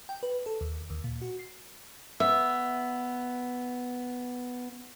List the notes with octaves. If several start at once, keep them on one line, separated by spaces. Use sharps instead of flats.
G5
B4
A4
D#2
D#2
A#2
F#4
C7
B3 E5